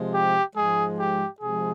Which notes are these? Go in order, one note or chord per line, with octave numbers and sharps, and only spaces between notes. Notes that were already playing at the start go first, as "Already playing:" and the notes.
Already playing: C3 F3 G#3
G4
G#2 F3 G#3 G#4
G4
C3 F3 G#3 G#4